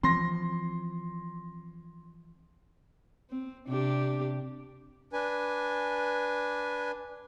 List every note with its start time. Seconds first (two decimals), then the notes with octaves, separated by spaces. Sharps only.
0.03 E3 F3 C4 C6 A#6
3.30 C4
3.68 C3 D4 G4
5.13 D4 B4 G#5